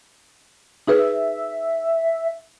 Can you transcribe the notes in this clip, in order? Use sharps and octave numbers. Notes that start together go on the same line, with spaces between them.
D#4 G#4 B4 E5